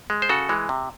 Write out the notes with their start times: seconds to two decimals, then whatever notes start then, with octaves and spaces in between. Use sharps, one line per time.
0.10 G#3
0.22 C5
0.29 C#3 F#4 A4
0.49 E3 G#3
0.69 C3